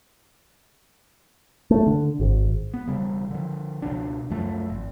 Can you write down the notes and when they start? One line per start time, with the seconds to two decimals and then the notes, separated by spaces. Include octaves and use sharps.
1.71 A3
1.87 D3
2.20 G#1
2.74 B3
2.86 E1 C#3 G3
3.31 D3 F3
3.82 C#2 B2 D4
4.30 C#2 F#2 F3 A3
4.69 G#1